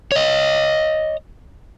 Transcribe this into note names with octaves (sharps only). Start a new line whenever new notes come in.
C#5 D#5